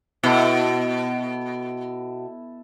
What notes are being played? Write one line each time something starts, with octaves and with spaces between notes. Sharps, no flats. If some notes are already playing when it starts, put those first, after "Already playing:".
B2 E4 A4 E5